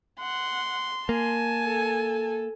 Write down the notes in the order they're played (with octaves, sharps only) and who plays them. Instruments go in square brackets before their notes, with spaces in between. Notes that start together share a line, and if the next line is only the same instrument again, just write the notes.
[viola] F#5 [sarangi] C6
[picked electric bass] A#3 [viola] G#5 A5
[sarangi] A4